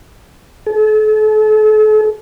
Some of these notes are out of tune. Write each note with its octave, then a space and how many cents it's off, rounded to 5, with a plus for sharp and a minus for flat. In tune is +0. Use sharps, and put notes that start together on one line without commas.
A4 -40